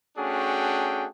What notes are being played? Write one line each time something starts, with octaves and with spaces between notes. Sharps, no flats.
A3 C#4 D4 F#4 G#4 G5